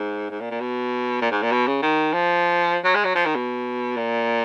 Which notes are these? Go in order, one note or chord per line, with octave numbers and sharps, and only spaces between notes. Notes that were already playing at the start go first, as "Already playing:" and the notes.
Already playing: G#2
G#2
A#2
A#2
B2
A#2
G#2
A#2
B2
C#3
D#3
F3
F#3
G#3
F#3
F3
D#3
B2
A#2